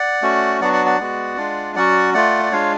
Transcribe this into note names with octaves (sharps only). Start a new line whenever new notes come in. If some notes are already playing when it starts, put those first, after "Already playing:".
Already playing: D5 F#5
A3 C#4 F#4
F#3 B3 D4 F#4 D5 F#5
D5 F#5
D5 F#5
G#3 B3 F#4
G#3 D4 F4
F#3 C#4 F#4 D5 F#5
A3 F4 D5 F#5
D5
G#3 D4 F4 C#5 F5